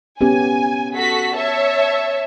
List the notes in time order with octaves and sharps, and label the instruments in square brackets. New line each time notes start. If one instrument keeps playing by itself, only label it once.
[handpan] B3 C#4 G4 [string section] G#5
[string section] F#4 A4 B6
C#5 E5 A5